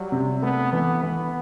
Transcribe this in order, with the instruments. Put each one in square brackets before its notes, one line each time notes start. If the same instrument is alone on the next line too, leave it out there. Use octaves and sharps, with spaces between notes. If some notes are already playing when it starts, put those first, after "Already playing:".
Already playing: [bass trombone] F#3 [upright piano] G3
[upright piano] C3
[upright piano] A3 [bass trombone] B3
[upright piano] E3 [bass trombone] B3
[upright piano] E3 [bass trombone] B3